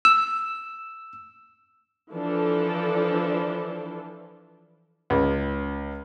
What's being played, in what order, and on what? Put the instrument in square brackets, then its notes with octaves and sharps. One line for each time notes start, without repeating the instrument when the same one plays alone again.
[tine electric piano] E6
[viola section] E3 F3 D4 A4
[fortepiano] C#2